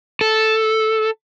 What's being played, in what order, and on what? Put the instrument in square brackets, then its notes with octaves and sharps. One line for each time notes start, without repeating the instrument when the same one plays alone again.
[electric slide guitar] A4